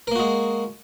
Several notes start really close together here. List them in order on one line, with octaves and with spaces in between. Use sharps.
A#4 A#3 F#4 G#3